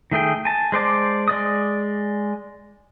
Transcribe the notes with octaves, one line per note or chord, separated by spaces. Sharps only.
D#3 A3 G#4 G5
G#5 A5
G#3 C5 D5 A5
G#3 D5 D#6